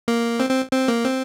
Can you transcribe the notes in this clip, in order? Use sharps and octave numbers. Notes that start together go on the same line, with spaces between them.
A#3
C4
C4
C4
A#3
C4